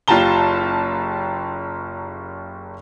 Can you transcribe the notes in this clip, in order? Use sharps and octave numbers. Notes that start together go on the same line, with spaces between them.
F#1 F4 G4 A5 A#5 G7